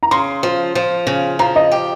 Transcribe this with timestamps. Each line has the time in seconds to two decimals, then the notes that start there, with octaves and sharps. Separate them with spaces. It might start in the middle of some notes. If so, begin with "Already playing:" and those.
0.03 A#5
0.11 C#3 C6
0.43 F3
0.75 F3
1.07 C#3
1.39 F3 A#5
1.56 D#5
1.72 G4